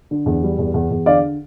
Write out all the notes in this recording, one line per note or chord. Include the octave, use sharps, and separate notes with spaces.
D3
E2
G3
E2
E2
E2
D3 D5 F5